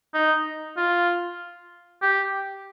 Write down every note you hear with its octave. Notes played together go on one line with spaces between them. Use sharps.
D#4
F4
G4